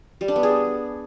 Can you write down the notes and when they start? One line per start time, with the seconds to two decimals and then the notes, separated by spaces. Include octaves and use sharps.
0.21 G3
0.28 D4
0.36 B3
0.43 G#4